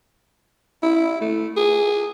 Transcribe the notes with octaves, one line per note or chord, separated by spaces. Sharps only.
E4
A3
G#4